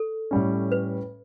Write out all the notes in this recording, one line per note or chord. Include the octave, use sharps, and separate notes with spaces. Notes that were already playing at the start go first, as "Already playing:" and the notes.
Already playing: A4
A2 G3 C#4
B4